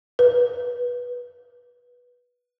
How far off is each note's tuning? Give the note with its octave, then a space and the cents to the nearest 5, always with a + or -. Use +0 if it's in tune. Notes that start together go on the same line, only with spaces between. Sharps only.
B4 -15